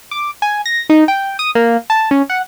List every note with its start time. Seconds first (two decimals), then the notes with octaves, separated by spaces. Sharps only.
0.11 D6
0.42 G#5
0.66 A#6
0.89 D#4
1.08 G5
1.39 D#6
1.55 A#3
1.90 A5
2.11 C#4
2.30 F#5